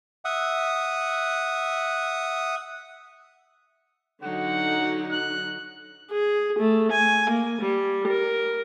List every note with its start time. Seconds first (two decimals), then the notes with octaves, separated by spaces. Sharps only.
0.25 E5 F#5 D#6
4.24 D3 F#3 D#4 F#5
5.12 F#6
6.12 G#4
6.59 A3
6.92 G#5
7.30 A#3
7.61 G3
8.08 A#4